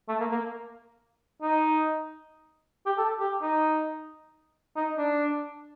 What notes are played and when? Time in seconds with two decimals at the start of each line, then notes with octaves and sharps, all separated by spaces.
0.08 A3
0.20 A#3
0.31 A#3
1.42 D#4
2.86 G4
2.98 A4
3.20 G4
3.42 D#4
4.76 D#4
4.97 D4